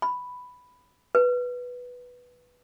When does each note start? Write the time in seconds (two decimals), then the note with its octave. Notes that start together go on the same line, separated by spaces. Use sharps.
0.02 B5
1.15 B4